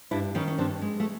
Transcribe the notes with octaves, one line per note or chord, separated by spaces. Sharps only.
G2 D4 E4
D#3 C#4 D#4
C#4
G2 C4 D4
G#3
A3